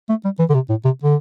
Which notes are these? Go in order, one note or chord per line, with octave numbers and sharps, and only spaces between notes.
A3
G3
E3
D3
C3
A2
C3
D3